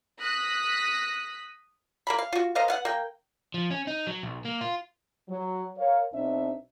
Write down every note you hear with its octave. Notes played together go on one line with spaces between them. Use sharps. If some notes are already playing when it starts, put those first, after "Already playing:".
D#6 F#6 A#6 B6
A#3 A#5 B5
F5
F4 F#4
A#4 C5 D#5 F5
B3 F5 F#5
A#3 G5
F3
C#4
D#4
F#3
B1
A#3
F4
F#3
A#4 C#5 F5
B1 B2 C4 D4 D#4 E5